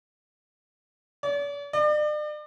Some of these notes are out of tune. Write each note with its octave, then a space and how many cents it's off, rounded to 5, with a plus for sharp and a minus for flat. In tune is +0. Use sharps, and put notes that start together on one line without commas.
D5 -45
D5 +40